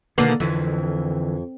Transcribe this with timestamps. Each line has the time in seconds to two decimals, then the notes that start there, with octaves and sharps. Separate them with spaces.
0.18 B2 D3 D#3 A#3 B4
0.40 F2 D3 E3